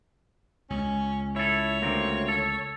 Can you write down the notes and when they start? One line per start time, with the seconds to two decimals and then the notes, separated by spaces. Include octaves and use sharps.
0.70 C#2 C#4
1.36 E4 A4 C#5
1.82 D2 A#3 C4
2.28 A4